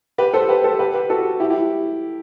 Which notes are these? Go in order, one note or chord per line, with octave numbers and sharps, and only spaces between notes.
G4 B4
A4 C5
G4 B4
A4 C5
G4 B4
G4 B4
F#4 A4
E4 G4
E4 G4